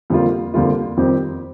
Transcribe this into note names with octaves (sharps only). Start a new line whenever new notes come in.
F2 D3 G3 A#3 F4
F2 D3 G3 A#3 F4
F2 D#3 G3 C4 G4